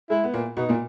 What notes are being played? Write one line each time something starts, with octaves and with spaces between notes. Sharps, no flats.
G#3 E4
B3
A#2 A#3
B2 B3 D#4
A#2 A#3